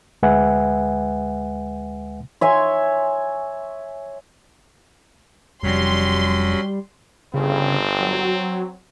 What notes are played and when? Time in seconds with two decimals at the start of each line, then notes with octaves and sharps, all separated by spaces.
0.23 D2 G#3 B4 E5 F#5 G#5
2.41 C#5 E5 G#5 C6
5.63 F1 F2 F#3 G3 C#4 B5 C6
7.34 G1 C#3 C4
7.99 F#3